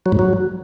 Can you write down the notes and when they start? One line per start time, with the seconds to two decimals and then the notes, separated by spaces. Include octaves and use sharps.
0.06 F#3
0.12 G#2
0.19 F#3